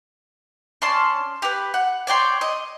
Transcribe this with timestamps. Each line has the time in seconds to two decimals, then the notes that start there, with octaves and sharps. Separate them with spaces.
0.82 C#4 D5 A5 C6
1.42 G4 B4
1.74 F#5
2.07 C#5 D5 G5 C6
2.41 D#5